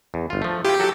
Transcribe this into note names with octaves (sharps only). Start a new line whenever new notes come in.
E2
G1 F4
F3 A3
E4 F4 G4
F#3 F#4 A4